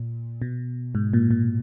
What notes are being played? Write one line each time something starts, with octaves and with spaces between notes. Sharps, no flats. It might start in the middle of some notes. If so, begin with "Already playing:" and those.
Already playing: A#2
B2
G#2
A#2
A#2